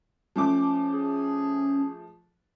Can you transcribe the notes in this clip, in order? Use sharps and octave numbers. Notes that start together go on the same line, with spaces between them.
F3 A3 C#4 D6
G#4